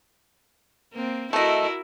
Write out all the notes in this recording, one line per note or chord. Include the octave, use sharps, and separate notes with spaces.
A#3 C4
A3 E4 F#4 A#4 D#5